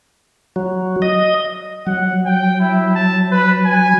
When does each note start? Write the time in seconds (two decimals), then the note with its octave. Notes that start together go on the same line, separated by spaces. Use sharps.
0.56 F#3
1.02 D#5
1.87 F#3 F#5
2.25 G5
2.60 E4
2.95 A5
3.32 B4
3.64 G#5